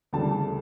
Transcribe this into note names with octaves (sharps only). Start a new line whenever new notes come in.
D2 C#3 E3 G3 A5